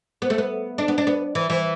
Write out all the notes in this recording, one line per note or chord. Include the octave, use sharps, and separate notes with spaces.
B3
A3
B3
D4
B3
D4
B3
E3
E3